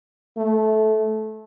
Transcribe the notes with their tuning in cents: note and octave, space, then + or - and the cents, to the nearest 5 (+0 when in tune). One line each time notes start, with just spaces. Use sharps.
A3 -20